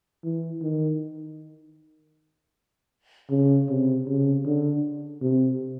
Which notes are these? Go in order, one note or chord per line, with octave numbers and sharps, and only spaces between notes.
E3
D#3
C#3
C3
C#3
D3
C3